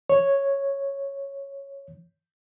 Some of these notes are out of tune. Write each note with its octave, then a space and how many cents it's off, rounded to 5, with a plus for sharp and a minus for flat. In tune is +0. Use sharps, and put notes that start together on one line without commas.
C#5 -5